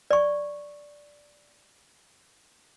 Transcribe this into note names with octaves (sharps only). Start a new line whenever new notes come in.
D5 C#6